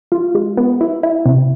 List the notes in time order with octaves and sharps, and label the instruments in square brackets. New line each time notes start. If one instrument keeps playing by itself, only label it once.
[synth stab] F4
G#3
B3
E4
E4
C3